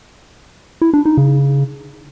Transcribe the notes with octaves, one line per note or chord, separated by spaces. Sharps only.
E4
D4
D#4
C#3